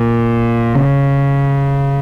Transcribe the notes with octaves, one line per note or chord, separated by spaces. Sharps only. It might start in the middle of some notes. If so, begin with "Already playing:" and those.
Already playing: A#2
C#3